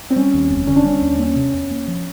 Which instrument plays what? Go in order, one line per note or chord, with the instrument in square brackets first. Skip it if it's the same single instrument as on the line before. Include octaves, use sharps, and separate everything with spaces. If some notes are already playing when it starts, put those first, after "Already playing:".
[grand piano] C4
[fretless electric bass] G3 [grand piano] C#4
[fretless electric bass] D#2
F1
[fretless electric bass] D3 [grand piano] C#4
[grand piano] D4
[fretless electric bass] G3 [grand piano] C#4
[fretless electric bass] D#2
[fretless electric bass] A#3 [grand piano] C#4
[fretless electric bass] C3
E2
A#3
F3